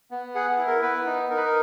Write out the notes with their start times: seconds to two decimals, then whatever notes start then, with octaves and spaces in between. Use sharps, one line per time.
0.11 B3
0.35 G#4 F#5
0.51 G#4
0.58 E4
0.67 A#4
0.82 B3 B4
1.06 D#4
1.30 D#4 A#4
1.37 B4
1.45 A#4